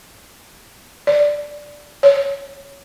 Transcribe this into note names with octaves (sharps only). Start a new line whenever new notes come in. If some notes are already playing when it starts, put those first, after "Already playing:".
D5
C#5